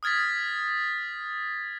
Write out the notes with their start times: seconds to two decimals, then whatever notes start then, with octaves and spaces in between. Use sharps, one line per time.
0.03 D#6 F6 G#6 A6 B6